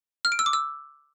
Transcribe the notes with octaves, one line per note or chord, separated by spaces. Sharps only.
F6
D7
E6
D6
E6